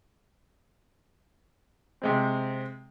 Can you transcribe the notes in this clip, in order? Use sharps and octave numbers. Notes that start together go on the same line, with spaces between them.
C3 G#3 C4